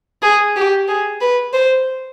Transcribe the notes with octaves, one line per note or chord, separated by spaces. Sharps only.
G#4
G4
G#4
B4
C5